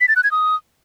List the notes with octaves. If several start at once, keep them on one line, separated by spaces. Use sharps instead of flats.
B6
A6
F#6
G#6
D#6